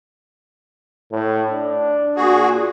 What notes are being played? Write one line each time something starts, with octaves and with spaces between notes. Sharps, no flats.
A2
D4
A#2 F#4 G#4